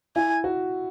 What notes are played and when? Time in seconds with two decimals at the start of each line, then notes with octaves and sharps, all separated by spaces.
0.16 E4 G#5
0.44 F#4